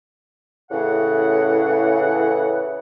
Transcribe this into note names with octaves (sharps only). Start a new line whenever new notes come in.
A2 C#3 E3 F#5